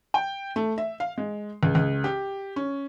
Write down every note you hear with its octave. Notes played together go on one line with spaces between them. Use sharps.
G5
A3
E5
F5
G#3
C#2
C#2
G4
C#4